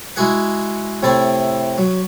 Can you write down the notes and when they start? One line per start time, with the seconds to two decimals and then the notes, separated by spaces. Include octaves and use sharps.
0.16 G#3 E4 F#4 G#4 F#5
1.03 A2 C3 A3 E4 A5 C6
1.78 F#3